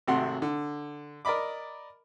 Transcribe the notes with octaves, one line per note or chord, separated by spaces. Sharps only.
G#1 C3 A3 F#4 F#5 C6
D3
A#4 D5 D#5 B5 D6